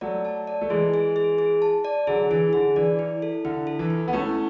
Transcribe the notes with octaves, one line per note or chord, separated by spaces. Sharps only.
F#3 A3 D5
A5
D5
A3
E3 G#3 G#4
G#4
G#4
G#4
A5
D5
D3 F#3 G#4
E3 G#4
D3 G#4
E3 D5
E4
A4
D3 E4
A4
E3
E4
B3
A3 C#4 E4